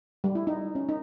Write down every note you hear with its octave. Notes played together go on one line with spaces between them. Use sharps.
G3
E4
D#4
C#4
D#4